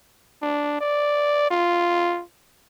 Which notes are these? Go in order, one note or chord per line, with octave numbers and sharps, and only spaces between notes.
D4
D5
F4